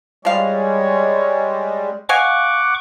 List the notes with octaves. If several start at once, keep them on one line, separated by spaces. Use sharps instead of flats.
F3 G3 G#3 C#5 F5
D#5 F5 F#5 G#5 C#6 D6